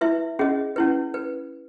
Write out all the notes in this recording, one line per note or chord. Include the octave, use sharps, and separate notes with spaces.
E4 B4 E5
C#4 G#4 D#5
C#4 E4 B4
B4